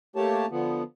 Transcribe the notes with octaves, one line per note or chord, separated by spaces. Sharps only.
A3 A#3 G4 C#5 A5
D3 F3 B3